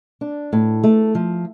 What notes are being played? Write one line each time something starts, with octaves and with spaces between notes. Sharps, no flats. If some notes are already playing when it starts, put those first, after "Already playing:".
D4
A2
A3
F3